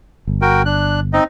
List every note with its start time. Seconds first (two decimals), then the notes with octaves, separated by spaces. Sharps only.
0.27 G1
0.42 F#4 A#4 G5
0.65 D4 F#6
1.13 C4 D#4 D#5